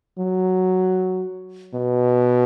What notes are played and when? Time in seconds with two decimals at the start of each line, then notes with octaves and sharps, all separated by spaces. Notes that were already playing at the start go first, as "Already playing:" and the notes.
0.18 F#3
1.74 B2